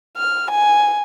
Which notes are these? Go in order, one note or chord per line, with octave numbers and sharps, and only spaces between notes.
F6
G#5